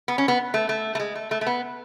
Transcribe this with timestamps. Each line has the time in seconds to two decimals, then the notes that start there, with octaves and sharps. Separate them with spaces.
0.08 B3
0.18 C#4
0.28 B3
0.54 A3
0.69 A3
0.95 A3
0.99 G#3
1.15 A3
1.31 A3
1.41 A3
1.47 B3